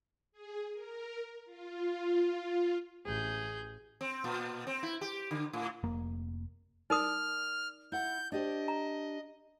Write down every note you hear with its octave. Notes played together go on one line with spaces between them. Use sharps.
G#4
A#4
F4
A1 G#4 G6
C4
A#2
C4
E4
G4
D3
A2
F1 A#3
D#4 A#4 D5 D#6 F6
E4 F#5 G6
D4 G4 C5 D#5
A#5